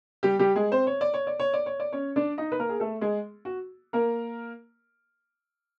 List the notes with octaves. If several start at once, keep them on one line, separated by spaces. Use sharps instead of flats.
G3 G4
G3 G4
G#3 G#4
C4 C5
C#5
D5
C#5
D5
C#5
D5
C#5
D5
C#4 C#5
D4 D5
D#4 D#5
B4
A#3 A#4
G#4
A3 A4
G#3 G#4
F#4
A#3 A#4